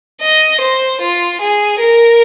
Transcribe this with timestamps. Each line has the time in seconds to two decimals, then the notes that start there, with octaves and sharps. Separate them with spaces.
0.22 D#5
0.61 C5
1.02 F4
1.42 G#4
1.81 A#4